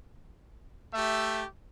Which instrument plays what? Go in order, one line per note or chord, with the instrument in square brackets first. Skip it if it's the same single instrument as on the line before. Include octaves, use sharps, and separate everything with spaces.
[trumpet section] A3 G4 E5